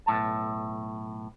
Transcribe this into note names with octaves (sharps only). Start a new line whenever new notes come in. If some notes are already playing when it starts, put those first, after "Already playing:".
B1 A2 A5